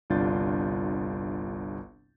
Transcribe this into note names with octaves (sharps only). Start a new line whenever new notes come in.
G1 C2 D4 F4 G6 A6